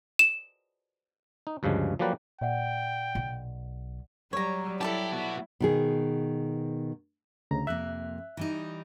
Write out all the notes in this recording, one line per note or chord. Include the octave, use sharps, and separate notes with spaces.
E7
D#4
D2 G2 C#3 F3 G#3
F3 F#3 A#3 G4 B4 D5
A#2 D5 E5 F#5 G5
B1
F#3 G3 C#5 A#5
E4 G4 A4 D5 A5
B3 F#4
B2 D#3 G#4
D2 C#3 A#5
F2 C3 A#3 E5 F#6
E3 G3 D#4